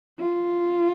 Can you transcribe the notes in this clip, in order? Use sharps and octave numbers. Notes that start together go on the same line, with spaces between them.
F4